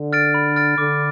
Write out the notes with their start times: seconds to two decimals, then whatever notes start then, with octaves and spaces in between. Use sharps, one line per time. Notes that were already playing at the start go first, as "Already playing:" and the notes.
Already playing: D3
0.13 F6 A6 D7
0.34 B5
0.56 F6 A6 D7
0.78 D3 D6